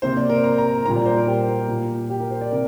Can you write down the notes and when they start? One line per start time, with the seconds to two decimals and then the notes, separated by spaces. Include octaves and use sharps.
0.02 C3 A#3 C5
0.17 D5
0.30 A#4
0.44 A#5
0.58 A#5
0.85 A#2 G3 A#3 A#5
0.96 D5
1.06 C5
1.17 A#4
1.27 G4
1.68 A#2 A#3
2.10 G4
2.20 A#4
2.31 C5
2.41 D5
2.52 C3 A#4